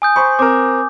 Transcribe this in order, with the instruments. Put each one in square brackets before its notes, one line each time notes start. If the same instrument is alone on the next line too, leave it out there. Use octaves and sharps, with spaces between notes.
[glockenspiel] G#5 D#6 G6
[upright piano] C5 B5 C#6
[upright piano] C4 A#4 [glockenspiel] D6